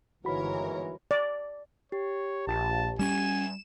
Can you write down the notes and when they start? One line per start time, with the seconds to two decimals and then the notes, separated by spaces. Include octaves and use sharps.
0.25 G1 D#2 G#2 E3 F#4 A#4 C#5 B5
1.11 D5
1.92 G4 C#5
2.47 A#1 A5
2.99 G3 C#4 G#5 E7